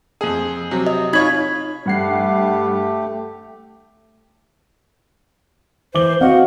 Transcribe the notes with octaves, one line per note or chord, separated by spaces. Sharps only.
F2 G#4
C3 F#3
D#5
D#4 F4 C#5 B5 G#6
G2 A3 G4 F#5 C7
E3 C5 D6 G7
C4 F#4 D#5 F5 F#5